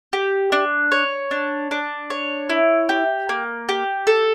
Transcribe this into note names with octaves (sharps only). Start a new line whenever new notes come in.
G4
D4
C#5
D4
D4
C#5
E4
G4
A#3
G4
A4